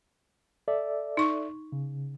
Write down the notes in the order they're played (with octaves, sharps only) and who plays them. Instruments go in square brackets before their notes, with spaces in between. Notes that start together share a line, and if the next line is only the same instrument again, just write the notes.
[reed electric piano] A4 D5 E5
[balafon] D#4 C#6
[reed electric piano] C#3